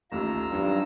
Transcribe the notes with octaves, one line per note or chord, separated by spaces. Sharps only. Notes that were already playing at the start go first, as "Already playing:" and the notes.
A1 D#2 A3 F4 A#5 E6
G2 F#3 C4 D#4